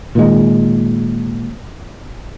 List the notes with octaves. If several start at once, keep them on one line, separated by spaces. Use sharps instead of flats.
A#2 D#3 G#3